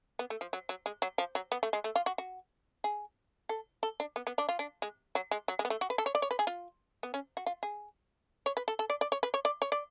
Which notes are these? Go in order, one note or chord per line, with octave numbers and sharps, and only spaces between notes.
B3
A3
F3
F#3
F#3
G#3
F#3
F3
F#3
B3
A3
G#3
A3
F4
F#4
F#4
G#4
A4
A4
D4
B3
B3
D4
F4
D4
G#3
F#3
G#3
F#3
G#3
B3
A3
F#4
B4
A4
C#5
D5
C#5
B4
G#4
F4
B3
C#4
F#4
F4
G#4
C#5
B4
A4
A4
D5
D5
C#5
B4
C#5
D5
C#5
D5